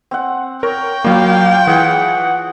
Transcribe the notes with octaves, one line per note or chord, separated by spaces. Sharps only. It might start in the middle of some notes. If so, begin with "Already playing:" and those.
C4 F#5
A#4 C#5 G5
F#3 G3 A#3 F4 G4 F5
E3 G#4 F#5